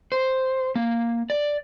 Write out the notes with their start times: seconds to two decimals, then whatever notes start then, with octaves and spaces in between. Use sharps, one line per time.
0.12 C5
0.76 A#3
1.30 D5